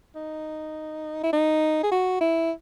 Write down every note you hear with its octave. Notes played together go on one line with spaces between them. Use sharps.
D#4
E4
D#4
G#4
F#4
E4